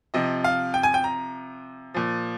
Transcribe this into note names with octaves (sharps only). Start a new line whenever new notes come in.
C3 F3 D#5
F5
G5
G#5
G5
A#5
A#2 F3